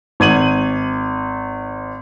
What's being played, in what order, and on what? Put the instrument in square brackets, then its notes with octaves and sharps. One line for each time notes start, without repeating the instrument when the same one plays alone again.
[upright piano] G#1 G#6 D#7 F#7